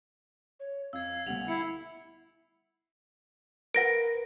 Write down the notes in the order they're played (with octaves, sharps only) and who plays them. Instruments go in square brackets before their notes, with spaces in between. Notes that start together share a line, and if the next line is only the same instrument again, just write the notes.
[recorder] C#5
[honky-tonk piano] F2 [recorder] F5 [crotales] E6 G#6
[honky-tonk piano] D2 B2 G3 [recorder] F#5 [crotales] F7 F#7
[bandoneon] E4 [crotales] C7 C#7
[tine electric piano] A#4 B4 [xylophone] F#5 A#6 D7